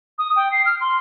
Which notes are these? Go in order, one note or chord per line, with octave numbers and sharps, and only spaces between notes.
D#6
G5
C7
F6
C6